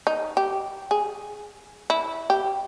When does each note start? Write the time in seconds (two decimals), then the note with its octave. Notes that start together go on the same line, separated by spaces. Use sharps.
0.07 D#4
0.37 G4
0.91 G#4
1.90 E4
2.30 G4